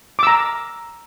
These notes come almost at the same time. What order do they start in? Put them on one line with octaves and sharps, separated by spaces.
D6 E6 A#5